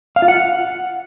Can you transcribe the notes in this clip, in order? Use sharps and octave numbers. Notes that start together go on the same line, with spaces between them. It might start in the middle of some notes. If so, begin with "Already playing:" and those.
F5
F4
F#5